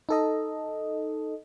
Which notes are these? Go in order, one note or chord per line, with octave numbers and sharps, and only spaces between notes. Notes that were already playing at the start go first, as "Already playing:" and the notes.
D#4 A4 D#5